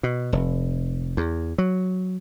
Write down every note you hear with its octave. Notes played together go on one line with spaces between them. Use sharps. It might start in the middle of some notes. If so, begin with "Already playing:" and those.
B2
F1
E2
F#3